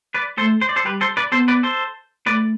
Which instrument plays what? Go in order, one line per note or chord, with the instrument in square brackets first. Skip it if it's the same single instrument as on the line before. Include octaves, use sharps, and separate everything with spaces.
[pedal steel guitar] B4 D5
[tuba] A3 [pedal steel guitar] A4 C5
[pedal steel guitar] C5
D5
A4 C5
[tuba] G3 [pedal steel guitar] G4 B4
[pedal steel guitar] A4 C5
B4 D5
[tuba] B3 [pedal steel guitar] A4 C5
[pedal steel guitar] B4 D5
A4 C5
[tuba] A3 [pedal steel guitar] B4 D5